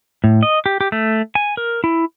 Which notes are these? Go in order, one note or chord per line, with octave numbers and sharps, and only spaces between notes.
A2
D#5
G4
G4
A3
G#5
A#4
E4